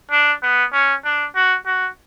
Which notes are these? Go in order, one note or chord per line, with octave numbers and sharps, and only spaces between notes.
D4
B3
C#4
D4
F#4
F#4